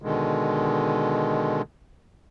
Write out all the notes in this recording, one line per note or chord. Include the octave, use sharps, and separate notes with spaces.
B2 D3 D#3 G#3